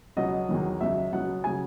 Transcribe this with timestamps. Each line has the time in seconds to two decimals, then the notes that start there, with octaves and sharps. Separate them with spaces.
0.17 C#2 B2 F#3 D#5
0.49 E2 D#3 F#3
0.81 C#2 B2 F#3 E5
1.12 C#2 B2 F#3 F#5
1.44 C#3 F#3 G#5